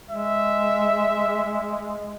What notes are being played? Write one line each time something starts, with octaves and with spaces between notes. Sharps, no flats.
G#3 E5